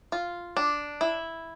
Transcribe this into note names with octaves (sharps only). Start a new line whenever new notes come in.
F4
D4
E4